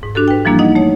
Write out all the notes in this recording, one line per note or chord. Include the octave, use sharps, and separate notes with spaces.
G#2
D4 F#4 G4 A4
B4 G5
E3 F3 G3 A#3 D4 E4
D#4 D#5 F#5
A3 C#5